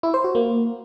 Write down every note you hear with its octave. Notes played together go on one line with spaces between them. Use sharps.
E4
C5
F#4
A#3